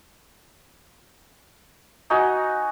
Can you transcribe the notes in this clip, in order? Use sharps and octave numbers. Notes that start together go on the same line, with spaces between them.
D#4 F#4 D#5 G#5